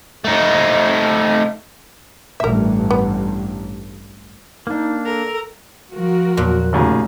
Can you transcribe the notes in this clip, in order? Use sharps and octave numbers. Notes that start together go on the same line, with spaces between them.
A3 D#4
A1 G2 A#4 E5
B3
A#3 D4 D#4
A4 A#4
F3 F#4 A#4
E2 A#2 F#3 F#6
G#1 D#2 A2 C#3 G#3